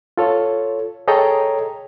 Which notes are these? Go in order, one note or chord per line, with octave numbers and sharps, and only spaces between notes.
F4 A4 C#5
G#4 A4 C#5 D#5 G5 A#5